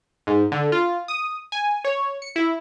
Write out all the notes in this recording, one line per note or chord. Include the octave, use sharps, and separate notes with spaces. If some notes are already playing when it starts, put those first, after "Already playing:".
G#2
D3
F4
D#6
G#5
C#5
C#7
E4